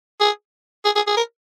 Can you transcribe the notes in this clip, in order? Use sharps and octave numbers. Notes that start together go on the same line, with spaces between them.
G#4
G#4
G#4
G#4
A#4